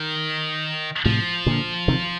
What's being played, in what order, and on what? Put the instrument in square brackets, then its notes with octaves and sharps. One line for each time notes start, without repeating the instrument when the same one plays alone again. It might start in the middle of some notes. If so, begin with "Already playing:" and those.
Already playing: [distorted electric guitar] D#3
[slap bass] A2 C3 [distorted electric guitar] F3
[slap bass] A#2 D3
C3 D#3